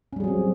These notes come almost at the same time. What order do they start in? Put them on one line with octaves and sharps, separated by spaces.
C#4 G3 G#4 F#3 C4